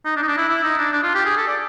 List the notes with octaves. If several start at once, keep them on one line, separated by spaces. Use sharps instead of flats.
D#4
D4
D#4
D4
E4
E4
D#4
D4
D4
F4
G4
G#4
A4
D5